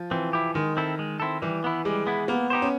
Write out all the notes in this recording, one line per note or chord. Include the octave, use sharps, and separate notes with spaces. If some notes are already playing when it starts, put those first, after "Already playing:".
Already playing: F3
E3 C4
E4 G4
D#3 G#3
C4 E4 A4
G#3
C4 E4 A4
E3 G3
B3 E4
G3 G#3
B3 E4
A#3 B3
D#4 G4 C5
C#4